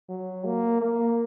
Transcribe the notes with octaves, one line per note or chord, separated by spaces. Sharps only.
F#3
A#3
A#3